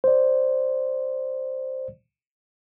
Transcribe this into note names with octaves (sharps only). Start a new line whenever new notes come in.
C5 D5